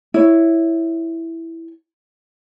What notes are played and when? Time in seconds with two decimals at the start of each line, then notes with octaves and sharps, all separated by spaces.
0.14 E4 C#5